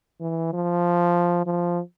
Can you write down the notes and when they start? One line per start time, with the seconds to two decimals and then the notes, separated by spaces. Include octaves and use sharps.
0.21 E3
0.53 F3
1.46 F3